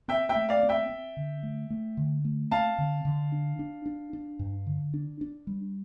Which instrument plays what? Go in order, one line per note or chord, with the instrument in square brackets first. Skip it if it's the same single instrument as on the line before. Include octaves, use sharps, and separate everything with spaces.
[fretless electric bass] C4 [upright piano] E5 G5
[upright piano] E5 G5
[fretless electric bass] A3
[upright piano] D5 F5
[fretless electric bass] C4
[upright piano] E5 G5
[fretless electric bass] C4
D3
A3
A3
D3
A3
[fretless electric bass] C4 [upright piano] F5 A5
[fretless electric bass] D3
D3
D4
D4
D4
D4
G2
D3
D4
D4
G3